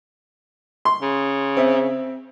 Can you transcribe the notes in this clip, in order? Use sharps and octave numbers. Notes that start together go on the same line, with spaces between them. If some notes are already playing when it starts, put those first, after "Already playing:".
C6
C#3
C4 E5